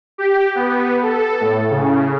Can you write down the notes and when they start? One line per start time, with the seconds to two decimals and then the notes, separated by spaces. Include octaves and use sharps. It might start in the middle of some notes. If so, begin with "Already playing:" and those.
0.18 G4
0.55 B3
1.03 A4
1.41 A2
1.70 C#3